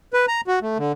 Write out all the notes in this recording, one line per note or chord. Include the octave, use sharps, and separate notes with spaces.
B4
A#5
F#4
A3
D3